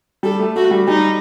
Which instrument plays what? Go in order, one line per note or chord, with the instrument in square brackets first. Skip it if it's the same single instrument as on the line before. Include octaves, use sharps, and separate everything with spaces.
[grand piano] G3 [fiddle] A4
[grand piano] A3
[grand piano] A3 [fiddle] F#4
[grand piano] G3
[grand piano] G3 [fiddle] D#4